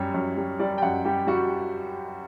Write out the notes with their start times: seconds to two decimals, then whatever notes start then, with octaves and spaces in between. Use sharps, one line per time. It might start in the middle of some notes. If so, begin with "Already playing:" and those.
Already playing: F#2 G3 C#5
0.14 F#2
0.37 G3
0.59 G3 D5
0.78 G5
0.82 F#2 F#5
1.05 G3 G4
1.27 G3 F#4